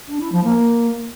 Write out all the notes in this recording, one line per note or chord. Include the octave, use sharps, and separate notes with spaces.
D4
E4
F3
A#3